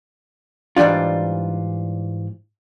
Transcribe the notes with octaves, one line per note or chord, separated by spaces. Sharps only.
G#2 E3 G3 D4 F4